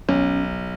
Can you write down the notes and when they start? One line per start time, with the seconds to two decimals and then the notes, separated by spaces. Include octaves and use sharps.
0.09 B1 C#4